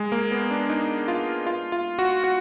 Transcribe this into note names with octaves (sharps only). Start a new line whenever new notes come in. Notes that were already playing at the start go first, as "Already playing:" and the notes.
Already playing: G#3
A#3
B3
D4
D#4
F4
F4
F4
F#4
F#4